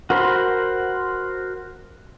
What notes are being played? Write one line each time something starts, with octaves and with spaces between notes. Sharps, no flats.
F#4 A#4 C5 B5 C6